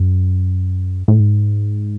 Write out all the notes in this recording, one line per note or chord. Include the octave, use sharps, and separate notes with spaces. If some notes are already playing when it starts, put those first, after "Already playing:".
Already playing: F#2
A2
G#2